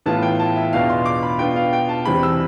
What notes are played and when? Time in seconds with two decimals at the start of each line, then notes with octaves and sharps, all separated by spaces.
0.06 A2 E3 B3 F4 A5
0.22 G5
0.39 A5
0.56 E5
0.73 E2 B2 B3 D4 F4 F5
0.90 C6
1.05 D6
1.23 B5
1.39 B2 B3 D4 F4 G5
1.56 F5
1.73 G5
1.89 A5
2.05 E2 C3 E3 G3 C4 B5
2.23 E6